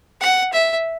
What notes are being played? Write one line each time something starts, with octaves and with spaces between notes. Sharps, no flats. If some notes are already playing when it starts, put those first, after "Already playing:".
F#5
E5